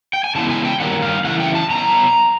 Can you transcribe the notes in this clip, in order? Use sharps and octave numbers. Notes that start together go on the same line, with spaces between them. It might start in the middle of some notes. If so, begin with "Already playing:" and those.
G5
G#5
C#3 E3 G#3 B3 A5
G#5
G5
G2 D#3 F#3 A#3 F#5
F5
C#3 E3 A3 F#5
G5
A5
B2 F#3 A#5